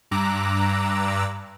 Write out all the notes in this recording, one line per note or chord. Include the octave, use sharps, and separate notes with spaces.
G2 A#5 D6 E6 F#6